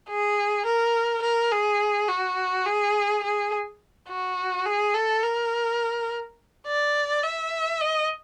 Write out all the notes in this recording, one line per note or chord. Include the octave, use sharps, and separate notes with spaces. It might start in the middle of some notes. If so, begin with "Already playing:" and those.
G#4
A#4
A#4
G#4
F#4
G#4
G#4
F#4
G#4
A4
A#4
D5
E5
D#5